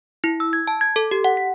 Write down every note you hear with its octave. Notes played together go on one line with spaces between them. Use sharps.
E4
E6
G#6
A5
G#6
A4
G4
F#5
B6